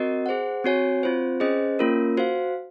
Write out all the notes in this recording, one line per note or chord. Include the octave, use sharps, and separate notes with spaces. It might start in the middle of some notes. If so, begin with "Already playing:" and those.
Already playing: C4 F#4 A#4 D#5
G#4 C5 F#5
C4 F#4 C#5 G#5
C4 F4 C5
C#4 G#4 C5 D#5
A#3 C#4 F4 A#4
F#4 C5 F5